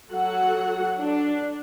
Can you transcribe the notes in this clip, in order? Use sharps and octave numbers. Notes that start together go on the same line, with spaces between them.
F#3 F#4 A4 F#5
D4